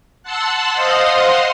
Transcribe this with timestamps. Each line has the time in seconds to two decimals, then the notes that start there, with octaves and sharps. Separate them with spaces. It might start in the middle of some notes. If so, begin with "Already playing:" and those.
0.23 F#5 A5 C6 E6 F#6
0.73 C5 D#5 F5 F#5 C6 D#6